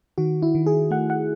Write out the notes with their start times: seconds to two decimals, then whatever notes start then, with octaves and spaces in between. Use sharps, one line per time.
0.18 D#3 F#4
0.42 E4
0.55 D#3
0.66 G#4
0.91 A3 F#5
1.10 F#5